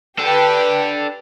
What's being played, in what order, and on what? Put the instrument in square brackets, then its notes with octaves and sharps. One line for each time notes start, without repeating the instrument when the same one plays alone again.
[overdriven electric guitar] D4 A4 [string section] G4 B4